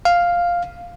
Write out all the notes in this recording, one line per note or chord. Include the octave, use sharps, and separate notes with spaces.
F5